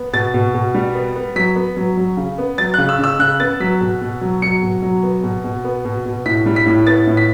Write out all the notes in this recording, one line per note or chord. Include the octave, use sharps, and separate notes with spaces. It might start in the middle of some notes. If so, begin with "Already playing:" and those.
Already playing: B3
B2 A6
B2
B2
G3
B3
B3
F#3 B6
B3
F#3
F#3
C#3
B3
F#3 A6
C#3 F#6
E6
C#3 E6
C#3 F#6
B3 A6
F#3 B6
B2
B2
F#3
F#3 C#7
B2
F#3
B3
B2
B2
B3
B2
B2
A2 B6
G3
B6
A2
B3 A6
A2
B6